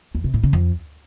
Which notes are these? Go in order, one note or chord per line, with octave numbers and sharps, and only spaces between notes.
E2
C3
A2
C#3
F2